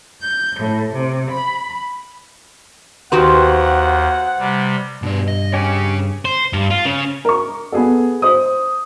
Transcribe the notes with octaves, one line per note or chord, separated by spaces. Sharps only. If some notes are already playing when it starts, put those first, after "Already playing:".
G6
A2
C3
B5
D#2 D#3 F#4 G4 C5 F#5
C3 G3
G2 B2 D5
D#5
C#4 G4 G#4 C#5
C5
G2
F4
C#3
A#4 C#6
B3 G#4 A4
C5 D#6